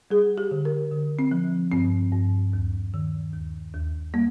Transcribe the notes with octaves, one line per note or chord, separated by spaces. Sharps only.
G3 G#4
G4
D3
A#4
D3
C4
F3
G2 C4
G2
D#2
D#3
D#2
D#2
G3 A#3